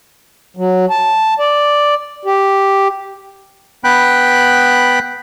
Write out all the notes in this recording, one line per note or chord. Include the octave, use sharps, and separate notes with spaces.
F#3
A5
D5
G4
B3 G5 B5 F#6